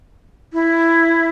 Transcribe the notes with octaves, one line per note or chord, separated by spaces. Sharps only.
E4